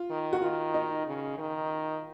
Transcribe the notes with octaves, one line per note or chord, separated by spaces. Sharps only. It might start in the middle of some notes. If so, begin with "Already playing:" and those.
Already playing: F4
D#3
F#4
D#3 F4
D#4
C#3
D#3